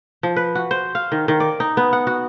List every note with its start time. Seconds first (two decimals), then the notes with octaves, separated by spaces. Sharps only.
0.23 F3
0.36 B4
0.55 F#4
0.71 C5
0.95 F5
1.12 D#3
1.28 D#3
1.40 D5
1.60 D#4
1.77 B3
1.93 F#5
2.07 F#4